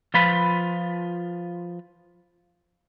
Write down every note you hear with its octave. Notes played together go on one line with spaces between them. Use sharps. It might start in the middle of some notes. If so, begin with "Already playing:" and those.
F3 F4 B4 B5